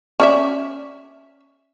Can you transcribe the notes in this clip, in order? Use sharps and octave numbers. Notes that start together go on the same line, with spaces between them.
C#4 D5 E5